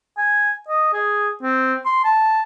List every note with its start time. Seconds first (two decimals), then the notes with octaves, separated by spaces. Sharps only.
0.18 G#5
0.68 D#5
0.93 G#4
1.43 C4
1.86 C6
2.04 A5